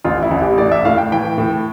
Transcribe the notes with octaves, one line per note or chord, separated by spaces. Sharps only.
A1 F4
E4
A1
G4
A2 D5
E5
A2 F5
G5
E3 G5
A2